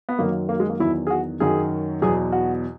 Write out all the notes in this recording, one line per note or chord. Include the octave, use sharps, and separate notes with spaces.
B3
F#2 D#3 F#3 A#3
A#3
G#3
A#3
E2 D#3 F#3 E4
G#4
F#4
F#2 D#3 F#3 G#4
E2 B2 F#3 G#4
F#4